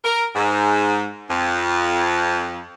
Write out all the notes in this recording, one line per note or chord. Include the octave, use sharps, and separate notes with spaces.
A#4
G#2
F2